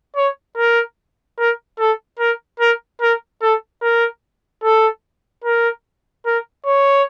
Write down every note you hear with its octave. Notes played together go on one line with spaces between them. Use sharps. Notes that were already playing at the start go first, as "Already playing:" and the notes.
C#5
A#4
A#4
A4
A#4
A#4
A#4
A4
A#4
A4
A#4
A#4
C#5